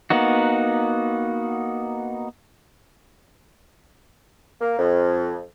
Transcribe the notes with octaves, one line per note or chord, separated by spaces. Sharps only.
A#3 B3 D#4 F#4
A#3
F2